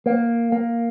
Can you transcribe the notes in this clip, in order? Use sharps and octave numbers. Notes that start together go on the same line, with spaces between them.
A#3
A#3